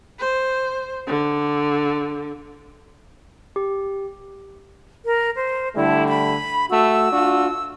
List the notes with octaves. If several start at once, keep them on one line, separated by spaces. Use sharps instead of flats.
C5
D3
G4
A#4
C5
D3 G3 A3 E4
B5
A3 F#4 E6
D4 F4 F#4